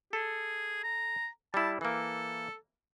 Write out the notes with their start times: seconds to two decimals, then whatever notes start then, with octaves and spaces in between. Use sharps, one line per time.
0.13 G#4 A4
0.84 A#5
1.54 G3 E4 A5
1.81 E3 A#3 A4